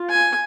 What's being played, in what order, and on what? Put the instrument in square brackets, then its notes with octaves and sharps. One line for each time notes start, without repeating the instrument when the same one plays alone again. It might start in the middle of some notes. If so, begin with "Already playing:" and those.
Already playing: [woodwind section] F4
[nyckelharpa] G#5